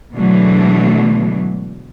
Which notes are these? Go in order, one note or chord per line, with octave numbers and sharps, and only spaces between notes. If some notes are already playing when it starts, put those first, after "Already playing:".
B2 D3 E3 F#3 G#3 A3